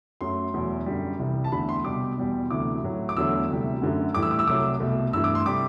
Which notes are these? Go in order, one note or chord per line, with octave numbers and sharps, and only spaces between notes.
F#2 F#3 A3 C6
E2 B2 F#3 A3
F#2 D3 G3
C2 C3 E3 G3
A5
E2 D3 A3 B5
C6
C2 B2 G3 D6
E2 B2 G3
D2 C3 E3 D6
A2 F#3 A3
D6
E2 D3 F#3 A3 E6
D2 C3 E3 G3
F#2 D3 A3
A2 E3 G3 D6
E6
D6
E6
C2 C3 F#3 A3 D6
C2 B2 A3
G2 E3 A3 E6
D6
C6
C3 G3 D6